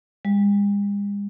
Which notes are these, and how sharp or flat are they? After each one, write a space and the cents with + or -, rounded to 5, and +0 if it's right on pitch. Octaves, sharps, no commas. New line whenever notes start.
G#3 -45